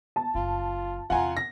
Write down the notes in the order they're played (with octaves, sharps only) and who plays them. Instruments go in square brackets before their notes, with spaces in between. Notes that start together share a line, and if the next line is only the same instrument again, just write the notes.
[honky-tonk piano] A5
[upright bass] F#1 [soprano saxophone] F4
[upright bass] E2 C3 [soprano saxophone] F4 [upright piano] F#5 G#5 A#5
[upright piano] A#6